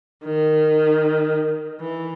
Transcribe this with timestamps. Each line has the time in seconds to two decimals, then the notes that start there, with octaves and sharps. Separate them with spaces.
0.25 D#3
1.81 E3